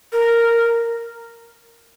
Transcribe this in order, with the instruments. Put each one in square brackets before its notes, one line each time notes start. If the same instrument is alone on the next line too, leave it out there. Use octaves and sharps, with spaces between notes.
[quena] A#4